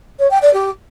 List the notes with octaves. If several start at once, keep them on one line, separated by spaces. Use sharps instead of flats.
C#5
G5
D5
G4